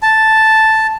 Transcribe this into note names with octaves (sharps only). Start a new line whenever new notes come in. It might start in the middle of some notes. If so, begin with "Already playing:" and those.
A5